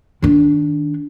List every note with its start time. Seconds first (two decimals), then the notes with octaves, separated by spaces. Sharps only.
0.22 D#3 D4